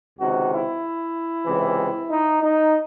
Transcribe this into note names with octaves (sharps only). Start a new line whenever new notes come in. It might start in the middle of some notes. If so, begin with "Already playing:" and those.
C#2 C3 D#3 F#4
E4
C#2 C3 E3
D#4
D#4